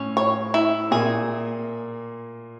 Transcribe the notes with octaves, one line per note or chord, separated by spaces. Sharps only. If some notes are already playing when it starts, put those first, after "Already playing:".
Already playing: A2 C#4
C#5
E4
A#2 A#3 G#4